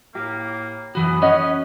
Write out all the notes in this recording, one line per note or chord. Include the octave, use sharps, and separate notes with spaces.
A2 A#3 G4
F#2 E3 F#4 B5 D#6
C#4 C#5 D#5 F#5